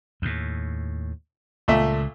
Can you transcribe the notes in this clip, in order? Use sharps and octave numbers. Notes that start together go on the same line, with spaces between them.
D#2 A2
C#2 A#2 A3 E5